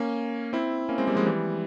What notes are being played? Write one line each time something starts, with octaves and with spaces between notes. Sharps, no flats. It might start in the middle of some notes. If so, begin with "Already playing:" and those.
Already playing: A#3 C#4
C4 E4
A#3 C#4
G#3 C4
G3 A#3
F3 G#3
E3 G3